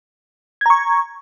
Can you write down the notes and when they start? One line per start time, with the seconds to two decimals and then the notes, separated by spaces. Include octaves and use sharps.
0.61 G#6
0.66 A#5
0.70 C#6